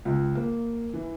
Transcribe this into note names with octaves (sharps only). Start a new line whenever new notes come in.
C#2
A#3
E3